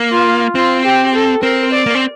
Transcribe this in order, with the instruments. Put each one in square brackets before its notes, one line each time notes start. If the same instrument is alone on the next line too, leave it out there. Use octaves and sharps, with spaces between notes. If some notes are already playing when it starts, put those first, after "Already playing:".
Already playing: [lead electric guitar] A#3
[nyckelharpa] F4
[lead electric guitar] C4 [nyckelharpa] F4
[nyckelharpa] G4
A4
[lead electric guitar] C4 [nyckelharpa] A#4
[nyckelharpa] D5
[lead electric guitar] A#3
C4